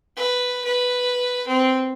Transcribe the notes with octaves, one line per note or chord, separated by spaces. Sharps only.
B4
B4
C4